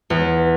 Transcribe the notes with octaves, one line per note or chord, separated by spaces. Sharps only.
E2